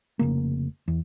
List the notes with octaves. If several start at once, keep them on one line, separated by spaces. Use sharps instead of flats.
F1 C#3 A#3
E2